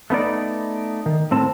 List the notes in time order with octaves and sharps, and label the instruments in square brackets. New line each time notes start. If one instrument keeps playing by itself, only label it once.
[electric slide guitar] A3 B3 D#4 D5
D#3
A2 C4 A5